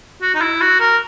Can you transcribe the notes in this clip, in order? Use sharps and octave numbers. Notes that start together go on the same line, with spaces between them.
F#4
D#4
E4
F#4
A#4